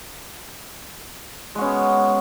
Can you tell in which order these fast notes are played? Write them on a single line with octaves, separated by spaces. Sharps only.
G#3 F#4 C#4 B3